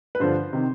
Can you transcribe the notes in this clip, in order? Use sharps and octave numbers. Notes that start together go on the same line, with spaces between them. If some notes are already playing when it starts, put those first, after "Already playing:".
B4
G2 D3 F3 C5
C3 D#3